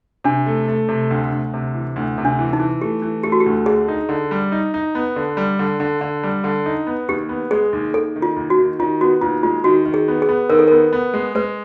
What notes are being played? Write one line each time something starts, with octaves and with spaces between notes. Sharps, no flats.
C3 D4
A3
A3
C3
D2
D2
C3
E3
D2
C3
D4
E3
D#4
E3
A3 G4
E3
A3 G4
F#4
G4
D2
D3 G#4
D#4
D3
G3
D#4
D#4
B3
D3
G3
D3
D3
D3
G3
D3
D#4
B3
D#2 G4
B3
G#3 G#4
D#2
D#2 A4
D#3
F4
D#2
F#4
D#3
D#3 F4
B3 F#4
D#2 F4
G#3 F4
D#3 F#4
D#3
G#4
B3
G#4
B3
D#3 A#4
A4
B3 A#4
B3
G#3
G#3 B4